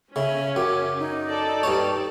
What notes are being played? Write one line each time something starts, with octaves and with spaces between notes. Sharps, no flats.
C#3 C#4 E5
F#2 D6
D#4
A4 D5
G2 C#5